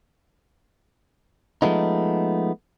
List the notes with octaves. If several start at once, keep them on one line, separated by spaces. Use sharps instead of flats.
F3 G#3 A3 B3 D#4